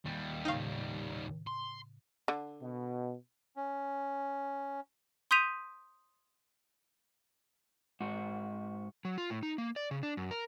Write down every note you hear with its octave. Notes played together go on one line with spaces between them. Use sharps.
D#2 G3
A2 C#3 D#4 F5 G5
C6
D3
B2
C#4
C6 D#6 G6 B6 D#7 F7
G#2 F#4
F#3
F4
A2
D#4
A#3
D5
C#3
D4
F#2
A#4